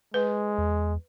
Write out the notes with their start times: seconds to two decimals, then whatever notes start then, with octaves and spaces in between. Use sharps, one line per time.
0.14 G#3 B4
0.58 E2